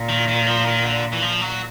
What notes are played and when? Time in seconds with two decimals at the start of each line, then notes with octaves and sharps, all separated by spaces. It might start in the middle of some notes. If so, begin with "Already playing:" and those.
Already playing: A#2
0.09 D#3
0.28 D#3
0.47 F3
0.66 D#3
0.84 D3
1.13 E3
1.22 F3
1.41 F#3